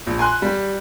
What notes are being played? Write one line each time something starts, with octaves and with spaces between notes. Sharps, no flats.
A#1
G#5 C6 F#6
G3